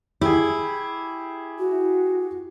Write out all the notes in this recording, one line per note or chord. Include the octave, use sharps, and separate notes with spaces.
E4 G4 G#4
F#4